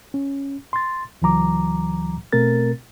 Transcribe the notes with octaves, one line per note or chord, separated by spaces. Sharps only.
C#4
C6 A6
C#2 E3 F#3 A#5 D6
B2 A3 C4 A#4 A6